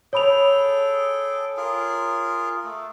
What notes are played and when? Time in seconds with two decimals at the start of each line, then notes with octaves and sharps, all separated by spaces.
0.13 G#4 A4 C#5 G5 B5 F7
1.57 F4 G#4 A#4
2.64 A3